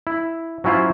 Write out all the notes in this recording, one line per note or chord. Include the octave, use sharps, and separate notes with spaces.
E4
F#3 C#4 E4 F4 C5